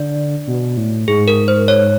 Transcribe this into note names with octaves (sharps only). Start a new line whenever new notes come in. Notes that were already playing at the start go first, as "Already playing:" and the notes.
Already playing: D3 D5
B2
A2
G#2 G#4
A#4
C5
C#5